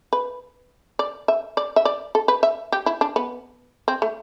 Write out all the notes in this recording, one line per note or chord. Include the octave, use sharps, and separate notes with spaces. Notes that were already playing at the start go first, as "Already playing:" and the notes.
B4
D5
E5
D5
E5
D5
A4
B4
E5
G4
E4
D4
B3
C4
A3